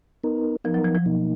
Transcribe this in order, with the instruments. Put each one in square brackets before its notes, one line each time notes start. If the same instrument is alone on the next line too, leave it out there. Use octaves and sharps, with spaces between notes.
[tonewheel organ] B3 D#4 A#4
[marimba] F3 [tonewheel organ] B3 D#4 A#4
[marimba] F#3
F3
F3
[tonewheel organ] B2 A#3 D#4